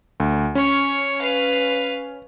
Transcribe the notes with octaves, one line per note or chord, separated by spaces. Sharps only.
D2
C#4 C#5 C#6
B4 F5